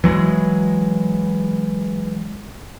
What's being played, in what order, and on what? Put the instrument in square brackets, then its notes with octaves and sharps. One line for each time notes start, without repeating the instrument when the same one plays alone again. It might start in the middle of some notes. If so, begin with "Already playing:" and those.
[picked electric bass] E3 F#3 G#3